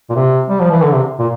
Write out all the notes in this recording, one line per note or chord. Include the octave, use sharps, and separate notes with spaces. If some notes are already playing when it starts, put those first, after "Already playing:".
A#2
C3
G3
F3
E3
D3
C3
A#2